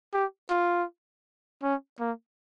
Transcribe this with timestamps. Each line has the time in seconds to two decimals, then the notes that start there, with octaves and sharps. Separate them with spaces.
0.14 G4
0.50 F4
1.63 C#4
2.00 A#3